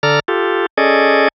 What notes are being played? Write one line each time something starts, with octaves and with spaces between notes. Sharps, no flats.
D3 A4 D5 A#5 F6
F4 G4 A4
C#4 G#4 A4 D5 D#5